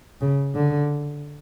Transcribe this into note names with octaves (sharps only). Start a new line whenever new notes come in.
C#3
D3